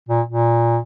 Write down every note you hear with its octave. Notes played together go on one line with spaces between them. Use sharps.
A#2
A#2